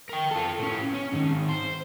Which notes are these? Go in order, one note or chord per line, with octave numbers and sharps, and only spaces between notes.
A#4 G5
F4 A4
A2 C#4
C#4
G#2 D#3
C5